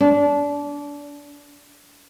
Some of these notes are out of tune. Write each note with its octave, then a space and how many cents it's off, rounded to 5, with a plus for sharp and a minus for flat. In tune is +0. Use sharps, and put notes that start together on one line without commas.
D4 -25